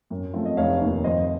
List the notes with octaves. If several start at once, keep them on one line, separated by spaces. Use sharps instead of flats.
F#2
F3 A3 C4 F4
D#5
F1 C#5 F5
D#2 D#3 A#3
F2 C5 D#5